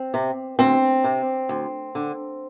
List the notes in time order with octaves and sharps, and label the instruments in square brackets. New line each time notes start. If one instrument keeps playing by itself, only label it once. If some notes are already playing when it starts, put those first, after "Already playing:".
Already playing: [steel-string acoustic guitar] C4
C3
D2 C4
C3
D2
D3